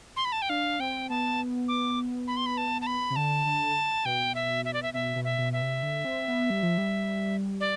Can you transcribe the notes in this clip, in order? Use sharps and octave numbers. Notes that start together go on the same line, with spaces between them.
C6
B5
A5
G5
D4 F5
C4 G5
B3 A5
D6
B5
C6
B5
A5
A5
B5
C3
D3 A5
D3
B2 G5
E5
E5
D5
E5
B2 E5
B2
E5
B2
E5
C3
D3
C4
B3
G3
F3
G3
D5